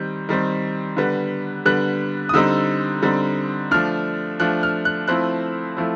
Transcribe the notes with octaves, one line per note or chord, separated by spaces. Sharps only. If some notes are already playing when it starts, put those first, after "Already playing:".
Already playing: D#3 G3 C4 G6
D#3 G3 C4
D3 G3 B3
D3 G3 B3 F#6
D#6
D3 G3 C4 D#4 E6
D3 G3 C4 D#4
F3 A3 D4 F6
F3 A3 D4 F#6
F6
F#6
F3 A3 C4 E4 F#6
F3 A3 C4 E4